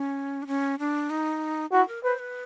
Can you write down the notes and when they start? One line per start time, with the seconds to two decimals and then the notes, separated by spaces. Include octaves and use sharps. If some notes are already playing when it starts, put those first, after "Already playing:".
Already playing: C#4
0.42 D4
0.47 C#4
0.79 D4
1.10 D#4
1.72 E4 F#4
1.88 A#4
2.04 B4 C5
2.19 B4